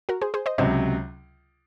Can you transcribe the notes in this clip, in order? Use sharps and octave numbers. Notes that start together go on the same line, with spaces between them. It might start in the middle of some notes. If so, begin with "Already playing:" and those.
F#4 A#4
G#4 C5
G#4 C5
C5 D#5
C#2 C3 F#3 C5 D#5